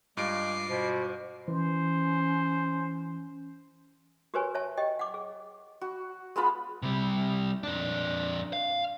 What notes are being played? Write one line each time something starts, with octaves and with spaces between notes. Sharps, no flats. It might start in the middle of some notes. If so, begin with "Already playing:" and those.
G2 G#3 F4 D6 C7 D7
B2 C5
E3 C#4 C5
F#4 G4 A#4 B4 C#5 G#5
C#5 E5 A5
G4 D#5 G5
F#5 D6
G#4
F#4
G#3 B3 F4 B5
C3 G3
F2 D4
F5